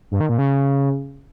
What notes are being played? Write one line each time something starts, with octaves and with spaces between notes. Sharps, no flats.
G2
D#3
A#2
C#3